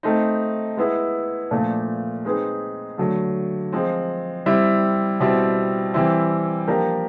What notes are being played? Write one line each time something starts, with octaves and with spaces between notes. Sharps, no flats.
A3 C4 D#4
G#3 B3 E4
A#2 F3 A3 D4
G#3 C4 D#4 G#4 B4
D3 F#3 A3
F3 G#3 C4
G3 C4 E4
B2 G3 C4 E4
E3 G3 C4 E4
F3 A#3 D4 G4 A#4